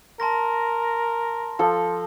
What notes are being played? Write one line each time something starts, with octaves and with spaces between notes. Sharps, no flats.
A#4 A5 C6 A#6
F3 A4